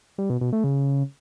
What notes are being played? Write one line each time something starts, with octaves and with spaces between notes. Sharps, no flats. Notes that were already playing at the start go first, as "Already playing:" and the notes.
G3
B2
B2
A3
C#3